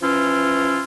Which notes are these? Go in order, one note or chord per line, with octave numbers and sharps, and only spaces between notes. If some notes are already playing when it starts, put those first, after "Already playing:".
E3 F3 C#4 E4 F4